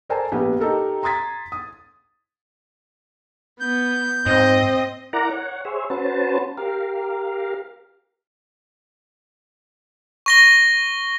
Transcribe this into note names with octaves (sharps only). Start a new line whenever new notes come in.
A4 A#4 C5 D5 G#5 A5
A#1 B3 G4 B4
D#4 G4 A4 A#4
A#5 C6 D#6 G#6 A6 B6
D#6
B3 G6
G#2 C4 D#5
E4 A#4 D5 F#5 A#5
C#5 F#5
G#4 C5 C#5 E5
C#4 F#4 B4 C5 A5
G4 A#4 F5
C#6 A#6 G7